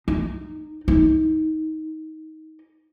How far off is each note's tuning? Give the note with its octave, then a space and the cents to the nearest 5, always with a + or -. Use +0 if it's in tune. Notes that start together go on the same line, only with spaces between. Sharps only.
D#4 -20
D#4 +20